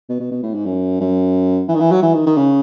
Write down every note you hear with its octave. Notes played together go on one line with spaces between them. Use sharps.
B2
B2
B2
A2
G#2
F#2
F#2
E3
D#3
E3
F#3
E3
D#3
D#3
C#3